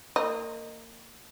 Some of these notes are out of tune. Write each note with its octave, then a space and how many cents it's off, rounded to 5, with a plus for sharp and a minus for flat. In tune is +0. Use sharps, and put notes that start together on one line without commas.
A#3 -25 D#5 -5